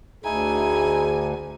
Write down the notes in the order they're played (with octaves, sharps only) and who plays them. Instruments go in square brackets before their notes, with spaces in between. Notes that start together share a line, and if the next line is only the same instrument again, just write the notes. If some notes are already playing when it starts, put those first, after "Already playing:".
[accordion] D2 [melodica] D#4 E4 [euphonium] G#4 [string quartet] G#5